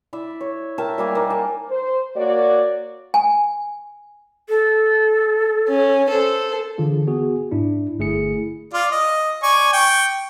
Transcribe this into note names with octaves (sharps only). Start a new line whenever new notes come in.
E4 D5 E5
C#5
A#4 E5 G5 A5
G3 A#3 G#5
A#3 D#4
A5
C5
A#3 F#4 C#5 D5
G#5
A4
C#4
A4 C5
D3 E3 F4 G#4
B3 F#4 G#4
G#2 D4 E4
G1 A3 E4 G#4 C#7
F4 D5
D#5
D5 G#5 C#6
G5 C#6